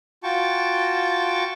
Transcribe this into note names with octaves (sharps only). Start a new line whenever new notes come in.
F4 F#4 G5 A5 C#6